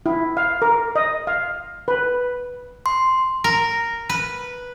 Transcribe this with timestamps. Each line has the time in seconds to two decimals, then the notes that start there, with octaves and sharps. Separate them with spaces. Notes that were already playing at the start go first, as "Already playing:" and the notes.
0.06 E4
0.37 F5
0.62 A#4
0.96 D#5
1.27 F5
1.88 B4
2.86 C6
3.44 A#4
4.09 B4